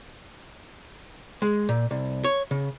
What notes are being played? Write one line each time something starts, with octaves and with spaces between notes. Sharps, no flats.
G#3
A#2
C2
C#5
C#3